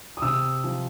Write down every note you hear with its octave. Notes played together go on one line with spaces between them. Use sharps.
D#6
C3 E6
F3